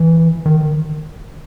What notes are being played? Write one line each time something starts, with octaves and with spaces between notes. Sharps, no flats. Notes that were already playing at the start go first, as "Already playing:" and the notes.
Already playing: E3
D#3